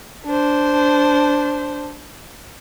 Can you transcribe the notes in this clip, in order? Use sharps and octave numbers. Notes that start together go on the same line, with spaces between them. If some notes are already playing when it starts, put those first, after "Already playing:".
D4 C5